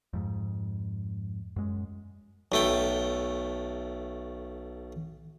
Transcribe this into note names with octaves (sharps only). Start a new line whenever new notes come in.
F2 G#2
F#2 G#3
B1 A3 G5